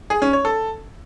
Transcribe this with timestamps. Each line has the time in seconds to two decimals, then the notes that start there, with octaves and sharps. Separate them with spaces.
0.10 G#4
0.22 C#4
0.33 C#5
0.45 A4